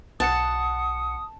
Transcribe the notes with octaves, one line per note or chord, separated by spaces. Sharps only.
B1 F#5 A5 D#6 C#7